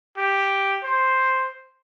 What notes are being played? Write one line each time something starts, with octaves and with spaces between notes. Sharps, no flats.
G4
C5